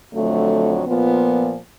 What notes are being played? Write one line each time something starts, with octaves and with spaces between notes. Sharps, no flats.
F2 D3 F#3 A3
A#2 F3 B3